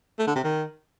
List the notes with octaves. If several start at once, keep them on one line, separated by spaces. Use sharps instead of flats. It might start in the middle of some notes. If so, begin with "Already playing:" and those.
A3
D3
C3
D#3